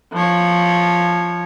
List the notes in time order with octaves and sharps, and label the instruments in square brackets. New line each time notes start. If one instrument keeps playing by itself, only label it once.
[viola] F3 C#5